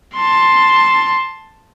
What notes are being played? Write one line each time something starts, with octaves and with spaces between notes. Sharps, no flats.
A5 C6